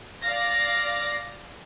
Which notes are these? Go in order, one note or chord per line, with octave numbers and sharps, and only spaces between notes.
D5 F5 A#6